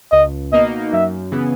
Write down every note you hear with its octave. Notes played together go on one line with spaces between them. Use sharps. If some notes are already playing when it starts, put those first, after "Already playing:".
C#2 D#5
B2 A#3 D#4 D#5
F#2 E5
C#3 E3 B3